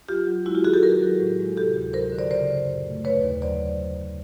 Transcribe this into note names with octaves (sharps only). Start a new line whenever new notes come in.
F#3 F4 G4
F#3
G#3 E4 F#4
F4 G4
D#3 F#4 G#4
G4 A4
F#3 G#4 A#4
F#3
A2
G#3
C3 G4 A4
D2
F#3 A#4 C5
D3
C5 D5
C#3 C5 D5
F#2
A#2
A3
D#2 B4 C#5
D#2
F#3 C5 D5